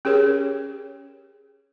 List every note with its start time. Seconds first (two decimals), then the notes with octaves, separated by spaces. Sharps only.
0.05 C#4 G4 G#4 A#4 C#5